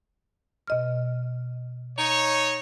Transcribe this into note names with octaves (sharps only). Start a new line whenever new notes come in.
B2 D#5 F6
D#4 C#5